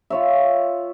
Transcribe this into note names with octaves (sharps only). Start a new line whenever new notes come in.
F4 C#5 E5